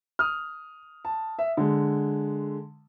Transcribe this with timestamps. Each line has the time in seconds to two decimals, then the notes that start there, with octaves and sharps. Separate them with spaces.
0.19 D#6 F6
1.05 A5
1.39 E5
1.57 D3 G#3